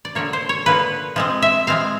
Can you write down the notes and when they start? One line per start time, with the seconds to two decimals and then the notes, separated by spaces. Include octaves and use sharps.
0.05 D5
0.15 D3 F3 A#3 C#5
0.33 C5
0.49 C#5
0.66 D3 F3 A#3 B4
1.16 F3 G#3 C4
1.42 E5
1.67 F3 G#3 C4 F5